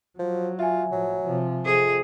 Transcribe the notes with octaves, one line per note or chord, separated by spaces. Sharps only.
F3 F#3
F4 E5 G#5
A2 F3 F#3
C3 F3
F2 G#4